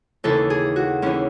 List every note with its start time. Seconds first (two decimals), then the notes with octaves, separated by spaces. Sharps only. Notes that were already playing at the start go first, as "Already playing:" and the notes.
0.24 D#2 C#3 E3 A4
0.50 G#4
0.76 F#4
1.02 D#2 C#3 E3 C#4